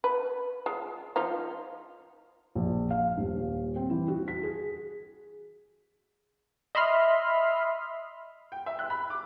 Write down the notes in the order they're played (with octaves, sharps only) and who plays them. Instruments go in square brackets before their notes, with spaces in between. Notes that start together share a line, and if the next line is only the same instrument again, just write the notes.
[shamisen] B4
G#3 F4
F3 D#4 F4
[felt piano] A#1
F5
D#1
C4
E3
F#4
B6
G#4
[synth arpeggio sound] D#5 E5 B5 C6 F6
[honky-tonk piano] G5
E5
F#6
B5
D6